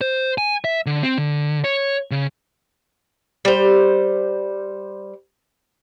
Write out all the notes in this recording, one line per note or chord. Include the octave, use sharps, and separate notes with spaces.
C5
G#5
E5
D3
C4
D3
C#5
C#3
G3 C5